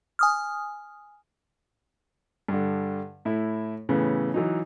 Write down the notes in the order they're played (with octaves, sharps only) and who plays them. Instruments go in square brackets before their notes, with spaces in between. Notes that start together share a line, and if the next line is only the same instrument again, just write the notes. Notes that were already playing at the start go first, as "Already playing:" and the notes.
[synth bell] G#5 D#6 F6
[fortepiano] G2 D3
A2 E4
A2 C#3 E3 B3
E3 F#3 D#4